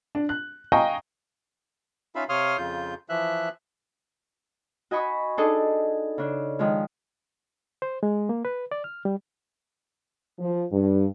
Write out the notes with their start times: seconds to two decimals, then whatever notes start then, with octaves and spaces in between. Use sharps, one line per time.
0.15 D4
0.29 F#6
0.72 D#5 F5 G5 G#5 A#5 C#6
2.15 C#4 D#4 F4 E5 F5 B5
2.29 C3 C#5 F5 C6 D#6 F6
2.58 F2 C#3 F4 G6
3.09 E3 F3 E5 F#6
4.91 F#4 D#5 G#5 B5 C#6 D#6
5.38 D4 D#4 G#4 A4 D#5
6.18 C#3 D4
6.59 D#3 F3 G#3
7.82 C5
8.03 G#3
8.29 A#3
8.45 B4
8.71 D5
8.84 F6
9.05 G3
10.39 F3
10.71 G2